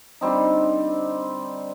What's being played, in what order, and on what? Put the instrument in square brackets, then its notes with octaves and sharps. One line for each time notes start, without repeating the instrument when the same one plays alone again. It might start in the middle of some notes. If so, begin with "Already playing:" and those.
[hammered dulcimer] D3 G3 C4 D#4